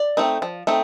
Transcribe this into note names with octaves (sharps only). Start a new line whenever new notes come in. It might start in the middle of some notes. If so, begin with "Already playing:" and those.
Already playing: D5
A3 C4 D#4
F3
A3 C4 D#4